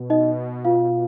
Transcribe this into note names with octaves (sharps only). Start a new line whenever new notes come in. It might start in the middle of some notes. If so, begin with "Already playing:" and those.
Already playing: B2
D#4 D#5
F4 F5